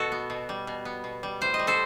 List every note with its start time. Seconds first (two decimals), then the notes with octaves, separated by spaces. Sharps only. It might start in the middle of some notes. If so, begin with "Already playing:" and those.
Already playing: B2 F#4 A4
0.12 B3
0.30 B2
0.49 G3
0.67 B2
0.85 B3
1.04 B2
1.23 G3
1.41 A2 C5
1.54 D#5
1.59 G3
1.67 A4 C5